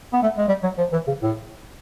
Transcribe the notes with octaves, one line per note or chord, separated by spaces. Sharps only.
B3
A3
G#3
G3
F#3
F3
E3
C#3
A2